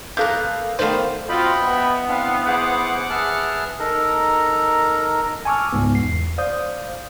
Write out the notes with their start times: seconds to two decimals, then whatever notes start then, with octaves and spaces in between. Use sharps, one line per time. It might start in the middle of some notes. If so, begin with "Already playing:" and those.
0.17 A#3 B3 A4 A#4 F5 F#6 G6
0.79 D#3 A3 B3 C5 D5 F5
1.29 C4 F4 F#4 D#5 G5 B5
1.61 B3 E5
2.08 C4 D4 E4 F5
2.47 G#4 C5 F#5 D6
3.10 G#4 B4 E5 A5 F6
3.80 D#4 A4 A#4 A#5
5.45 G#5 A5 C#6 D6 E6 F6
5.73 C#2 G#2 B3
5.95 E2 C7
6.38 C5 D5 F5 D#6 G6